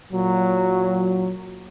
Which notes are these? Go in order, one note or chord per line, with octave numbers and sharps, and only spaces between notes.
A#2 F#3